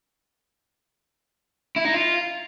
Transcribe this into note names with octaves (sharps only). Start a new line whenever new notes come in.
E4
D#4
F4